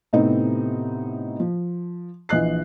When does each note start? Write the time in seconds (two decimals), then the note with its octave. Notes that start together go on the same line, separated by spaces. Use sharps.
0.13 A2 C3 A3 B3 C4 D#4
1.40 F3
2.29 A#1 E3 D#5 F#6 C7